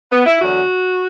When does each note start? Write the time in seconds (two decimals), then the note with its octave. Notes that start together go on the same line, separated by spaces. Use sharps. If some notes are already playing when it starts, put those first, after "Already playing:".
0.12 B3
0.26 E4
0.40 E2 D3 F#3 F#4